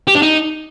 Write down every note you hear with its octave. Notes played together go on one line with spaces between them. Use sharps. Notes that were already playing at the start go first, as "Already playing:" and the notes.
G4
D4
D#4